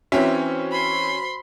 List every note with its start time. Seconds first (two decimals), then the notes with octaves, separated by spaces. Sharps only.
0.12 E3 C4 C#4 F#4 C5 E5
0.72 B5 C6